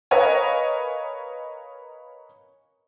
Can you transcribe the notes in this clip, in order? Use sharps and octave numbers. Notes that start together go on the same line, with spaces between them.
A#4 B4 C#5 D#5 F5 G#5